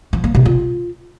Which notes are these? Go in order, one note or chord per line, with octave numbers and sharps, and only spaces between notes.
F3
A#3
C3
F4